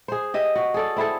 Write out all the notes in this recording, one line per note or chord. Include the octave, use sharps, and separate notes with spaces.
G#4 C5
G4 D#5 E5
F#4
G#4 A4 D5
C4 E4 G#4 A4